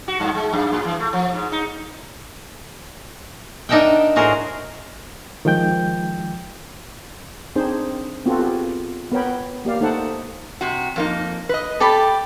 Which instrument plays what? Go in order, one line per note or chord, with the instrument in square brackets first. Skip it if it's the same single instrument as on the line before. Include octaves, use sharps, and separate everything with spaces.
[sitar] F#4
G2
G#3
F#2
A2
E3
A3
F3
G#2
D#4
[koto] D4 D#4 A#4 E5 F#5 G5
A2 F#4 G#4 A#4 C5
[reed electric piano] D#3 F3 G#3 G5 G6
[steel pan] C4 D4 D#4 G#4 C5
B3 C4 F4 F#4 A4
F4 G4 G#4
B3 A#4 C#5 G5 B5
A#3 G4 D5 F5
A3 D#4 A4 C5 F#5 A5
[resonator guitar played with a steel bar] C3 F#4
F2 A#3 D#4
B4 D#5
[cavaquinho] G4 D5 B5 [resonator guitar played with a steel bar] A4